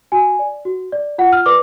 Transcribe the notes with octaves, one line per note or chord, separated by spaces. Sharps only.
F#4 G#5
D5
F#4
D5
F4 F#5
F6
B4 D5 D6